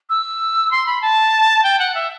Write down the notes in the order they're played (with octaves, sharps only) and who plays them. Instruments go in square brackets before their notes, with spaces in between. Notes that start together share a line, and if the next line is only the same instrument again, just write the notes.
[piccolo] E6
C6
B5
A5
G5
F#5
E5